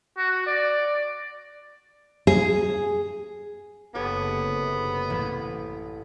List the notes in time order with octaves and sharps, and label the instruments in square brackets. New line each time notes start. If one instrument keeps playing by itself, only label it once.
[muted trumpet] F#4
D5
[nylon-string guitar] G#4
[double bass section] F#1 C3 [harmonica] B3 [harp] G4 A4 C#5
[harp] A1